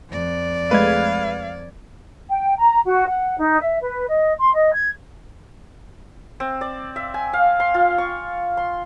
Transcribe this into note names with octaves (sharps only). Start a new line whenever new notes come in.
F2 D5
G#3 A3 B4 F5 G#6
G5
A#5
F#4
F#5
D#4
E5
B4
D#5
C6
D#5
G#6
C4
D5
E5
G#5
F5
C6
F4
C#6
C6